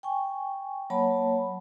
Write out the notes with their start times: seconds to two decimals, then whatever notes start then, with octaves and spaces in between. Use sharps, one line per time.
0.03 G5 G#5 C#6
0.90 F#3 A#3 C#5 F#5 A5 B5